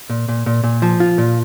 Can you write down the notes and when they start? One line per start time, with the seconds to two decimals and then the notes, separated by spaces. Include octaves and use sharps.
0.10 A#2
0.28 A#2
0.46 A#2
0.64 A#2
0.82 F3
1.00 F4
1.18 A#2